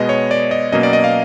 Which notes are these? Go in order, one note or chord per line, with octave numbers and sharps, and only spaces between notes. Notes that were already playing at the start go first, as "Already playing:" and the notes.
Already playing: B2 G#3 B3 D#5
C#5
D5
D#5
B2 F#3 A#3 C#4 D#5
D5
D#5
F5